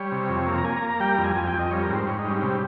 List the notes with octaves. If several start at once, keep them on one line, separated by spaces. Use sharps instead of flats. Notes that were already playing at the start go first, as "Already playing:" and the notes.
Already playing: G3 C#5
C3
F2
A#3
A#5
A#3 G#5
A#5
A#3
A#5
G3 G5
A#5
F2
G#5
F2 G#5
G5
F2
D#5
G3 C#5
A#4
G#2
C5
G#2 C#5
D#4
G3
C#4
C3 C#4